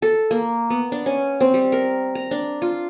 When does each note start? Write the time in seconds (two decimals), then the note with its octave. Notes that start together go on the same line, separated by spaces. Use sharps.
0.02 A4
0.31 A#3
0.70 B3
0.92 D4
1.06 C#4
1.40 C4
1.54 G3
1.72 A#4
2.15 A#5
2.31 D4
2.62 F4